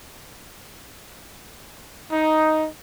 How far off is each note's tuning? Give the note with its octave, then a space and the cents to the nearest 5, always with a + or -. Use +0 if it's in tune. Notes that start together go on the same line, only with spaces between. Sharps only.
D#4 +5